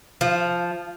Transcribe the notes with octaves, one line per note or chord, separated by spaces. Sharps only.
F3